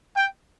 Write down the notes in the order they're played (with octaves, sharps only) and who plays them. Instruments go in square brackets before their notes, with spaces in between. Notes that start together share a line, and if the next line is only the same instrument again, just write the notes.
[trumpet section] G5